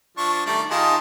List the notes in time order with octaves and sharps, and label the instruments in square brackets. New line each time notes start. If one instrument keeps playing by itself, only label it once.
[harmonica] F3 D4 C#6
[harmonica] D#3 G3 D5 [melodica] A3
[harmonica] D#3 G4 A5 [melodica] F4 G#4 D#5